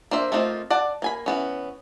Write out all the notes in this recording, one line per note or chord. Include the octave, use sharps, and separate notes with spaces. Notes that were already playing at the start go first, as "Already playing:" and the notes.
A#3 D4 C5 E5
A3 A#3 C4 D#4 F4
D5 F#5 A5
A#3 G#5 B5
E3 B3 C#4